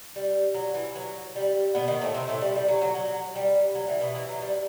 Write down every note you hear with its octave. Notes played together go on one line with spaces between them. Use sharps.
G3
F#3
E3
F#3
G3
B2 B3
D#3 D#4
A2 A3
C3 C4
A2 A3
G3
G3
F#3
F#3
F#3
G3
F#3
E3
B2 B3
E3 E4
F#3
G3